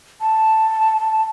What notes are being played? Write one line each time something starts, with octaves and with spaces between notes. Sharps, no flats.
A5